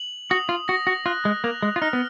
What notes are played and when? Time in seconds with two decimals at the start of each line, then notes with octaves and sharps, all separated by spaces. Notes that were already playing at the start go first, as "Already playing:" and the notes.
Already playing: F#7
0.30 F#4 D#6
0.49 F4
0.68 F#4 A#6
0.87 F#4
1.06 F4 F#6
1.25 G#3
1.44 A#3 F7
1.62 G#3
1.76 F4
1.82 D#4 F6
1.93 B3